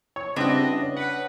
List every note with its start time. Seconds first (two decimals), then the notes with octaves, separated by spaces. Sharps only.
0.16 C#5 C#6
0.36 C#3 G3 C4 D4 E4 F#4 B4 D#5
0.81 C#4
0.97 B4 F#5